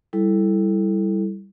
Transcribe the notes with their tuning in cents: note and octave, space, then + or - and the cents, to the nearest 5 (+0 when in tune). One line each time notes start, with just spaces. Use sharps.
G3 +0 E4 +0 A4 +0